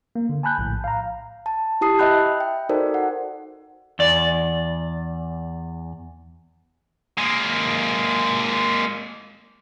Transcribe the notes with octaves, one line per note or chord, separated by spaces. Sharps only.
A#3
D3
G#5 A5 B5 F#6 G6
A#1 A2
F5 A#5
A5
E4 G4 A5 D#6 C7
D#5 E5 G5 B5 F#6 G6
G5
D#4 F#4 A4 A#4 C5 D5
F#5
E2 D5
G#3 A#3